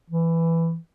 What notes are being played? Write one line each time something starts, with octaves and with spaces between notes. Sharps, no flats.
E3